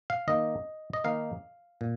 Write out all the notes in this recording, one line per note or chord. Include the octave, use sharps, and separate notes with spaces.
F5
D#3 A#3 D#4 D#5
D#5
D#3 A#3 D#4 F5
A#2